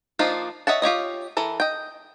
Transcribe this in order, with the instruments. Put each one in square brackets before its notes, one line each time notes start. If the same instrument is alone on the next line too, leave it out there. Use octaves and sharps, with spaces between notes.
[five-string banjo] F3 A#3 D4 D#4 F4
C#5 D#5 E5 F#5 A5
F4 G4 C#5 D#5
E3 A4 A#4
D#5 G5